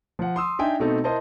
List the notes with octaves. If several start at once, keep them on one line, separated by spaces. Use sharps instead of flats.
F3 F#5
C6 D#6 E6
D4 D#4 E5 G5 G#5
B2 A3 C4 D#4 A4
E4 A#4 C5 D#5 A5